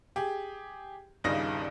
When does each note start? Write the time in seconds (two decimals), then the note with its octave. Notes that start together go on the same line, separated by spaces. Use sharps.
0.16 G4 G#4
1.24 D#1 C2 G2 C#3 D#4 A#6